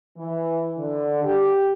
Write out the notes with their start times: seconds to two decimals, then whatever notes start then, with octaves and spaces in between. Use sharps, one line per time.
0.17 E3
0.77 D3
1.23 G4